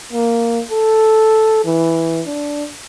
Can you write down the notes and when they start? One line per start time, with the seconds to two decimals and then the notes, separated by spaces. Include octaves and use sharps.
0.13 A#3
0.71 A4
1.65 E3
2.26 D4